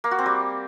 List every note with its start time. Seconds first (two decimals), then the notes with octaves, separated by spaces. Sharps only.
0.04 A#3
0.11 F#4
0.18 C4
0.26 G3